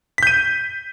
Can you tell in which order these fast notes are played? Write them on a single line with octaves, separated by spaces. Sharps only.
B6 G6 D#7